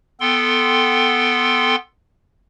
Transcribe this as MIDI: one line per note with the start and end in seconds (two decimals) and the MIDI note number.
0.20 1.75 59
0.20 1.75 69
0.20 1.75 79
0.20 1.75 84